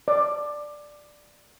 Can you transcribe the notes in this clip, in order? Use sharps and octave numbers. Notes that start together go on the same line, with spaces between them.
D5